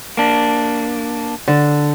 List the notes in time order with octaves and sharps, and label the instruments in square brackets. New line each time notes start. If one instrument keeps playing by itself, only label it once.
[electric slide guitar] A#3 D4
[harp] D3